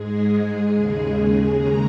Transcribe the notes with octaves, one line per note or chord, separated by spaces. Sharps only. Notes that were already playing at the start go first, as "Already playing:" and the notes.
Already playing: G#2 G#3 G#4
D#2 C#3 G#3
D#2 C#3 G#3 A#5